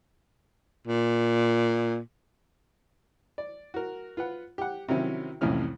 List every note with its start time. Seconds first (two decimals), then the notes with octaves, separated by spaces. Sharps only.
0.87 A#2
3.38 D5
3.74 F#4 A#4
4.17 F4 B4 F#5
4.58 G4 F#5
4.89 C3 D#3 F#3 C4 C#4 E4
5.41 C2 F2 A2 E3 C#4 F6